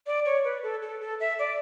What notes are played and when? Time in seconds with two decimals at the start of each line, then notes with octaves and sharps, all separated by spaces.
0.06 D5
0.26 C#5
0.44 B4
0.63 A4
0.82 A4
1.01 A4
1.20 E5
1.39 D5